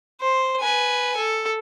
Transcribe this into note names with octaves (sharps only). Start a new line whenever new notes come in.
C5
B4 G#5
A4